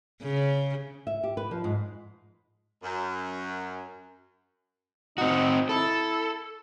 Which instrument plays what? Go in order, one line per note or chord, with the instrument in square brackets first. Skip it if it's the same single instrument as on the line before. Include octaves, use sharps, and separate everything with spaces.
[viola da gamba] C#3
[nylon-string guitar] E5
G4
B4
F3
G#2
[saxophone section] F#2
[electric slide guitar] C4 F#4 [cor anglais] D#4
[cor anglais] E4 [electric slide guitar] A4